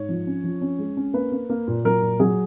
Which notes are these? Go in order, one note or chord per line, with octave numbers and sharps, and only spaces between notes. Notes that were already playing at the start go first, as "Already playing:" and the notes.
Already playing: G#2 C#5
F3
C#4
F3
C#4
G#3
C#4
A#3 B4
A#3
A#3
A#2
F#3 A#4
A#2
F#3 G#4